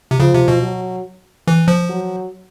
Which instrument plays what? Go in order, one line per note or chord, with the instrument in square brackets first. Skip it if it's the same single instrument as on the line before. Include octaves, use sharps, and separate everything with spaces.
[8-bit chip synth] C3
[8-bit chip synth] C#3 [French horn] F3
[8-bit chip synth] C3
B2
[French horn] F#3
[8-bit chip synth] E3
F3
[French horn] F#3